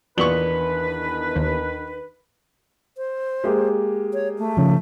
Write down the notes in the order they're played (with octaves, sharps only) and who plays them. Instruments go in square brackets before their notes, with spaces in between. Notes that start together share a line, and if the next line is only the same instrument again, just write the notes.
[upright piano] E2 F#7 [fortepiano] A#2 B3 C#6 [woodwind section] D#3 D4 B4
[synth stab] D#2
[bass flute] C5
[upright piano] G#3 A#3 G4
[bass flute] C#5
A3
[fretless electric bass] C#3 F3